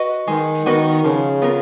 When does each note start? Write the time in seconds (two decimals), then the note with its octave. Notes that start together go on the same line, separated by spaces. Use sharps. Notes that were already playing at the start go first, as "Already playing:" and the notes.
Already playing: F#4 B4 D#5
0.28 D#3 G#3
0.66 D#3 B3 F#4 B4 D#5
1.04 C#3 F3
1.42 B3 F4 A#4